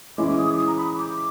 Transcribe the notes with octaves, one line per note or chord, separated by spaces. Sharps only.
E3 G#3 C#4 E4 D6
D6
D#6
D6
D#6
A#5
B5
D6